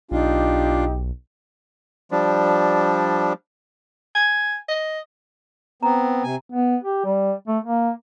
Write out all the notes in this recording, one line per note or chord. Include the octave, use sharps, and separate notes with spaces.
B1 D4 D#4 F4 G4
F3 G3 D4
G#5
D#5
B3 C4 A#5
C3 G#5
B3
G4
G3
A3
A#3